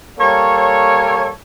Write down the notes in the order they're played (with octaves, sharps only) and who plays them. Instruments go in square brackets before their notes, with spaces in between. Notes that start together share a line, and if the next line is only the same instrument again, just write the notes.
[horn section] G3 A#3 A4 C#5